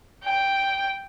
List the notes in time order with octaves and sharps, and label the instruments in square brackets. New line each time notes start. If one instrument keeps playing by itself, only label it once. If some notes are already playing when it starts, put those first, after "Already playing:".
[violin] G5